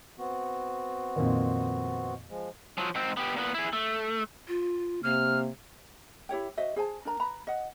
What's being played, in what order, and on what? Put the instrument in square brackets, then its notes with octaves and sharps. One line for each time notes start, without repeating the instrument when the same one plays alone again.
[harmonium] B3 C4 F#4
[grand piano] F2 A#2 D#3
[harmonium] F3 G#3
[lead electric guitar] F3 F#3
G#2 C4
B3 G4
A#2 B3
E4 G#4
A3
[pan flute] F4
[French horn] C3 [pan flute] A#3 [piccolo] F6
[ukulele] E4 G4 C#5 G5
F#4 C5 D#5 E5
G#4 C5 G#5 A5
D4 A#4 A#5
B4 A#5 B5
D#5 F#5